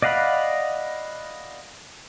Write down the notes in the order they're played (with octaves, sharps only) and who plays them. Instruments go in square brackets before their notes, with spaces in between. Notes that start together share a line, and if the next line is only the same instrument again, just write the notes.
[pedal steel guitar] D5 D#5 F5 F#5 B5